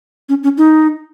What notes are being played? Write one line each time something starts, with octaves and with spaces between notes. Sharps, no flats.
C#4
C#4
D#4